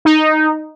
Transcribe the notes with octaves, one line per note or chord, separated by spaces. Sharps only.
D#4